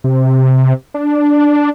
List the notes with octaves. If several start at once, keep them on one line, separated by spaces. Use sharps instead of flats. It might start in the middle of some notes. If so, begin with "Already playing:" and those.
C3
D4